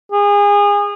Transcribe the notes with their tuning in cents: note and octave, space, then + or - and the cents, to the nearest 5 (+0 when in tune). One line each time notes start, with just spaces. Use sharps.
G#4 -30